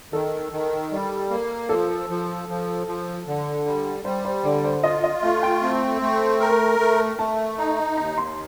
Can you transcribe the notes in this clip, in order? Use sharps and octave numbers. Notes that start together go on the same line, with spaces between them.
D#3 A4
D#3
G3
A#3
F3 A4
F3
F3
F3
D3
G3
G3 C5
C5
D3 D5
C5
F4 D#5
D#5
A3 F5
G5
C4
A3
A#4
A3
A3 A5
D#4
D#2 A#5
C6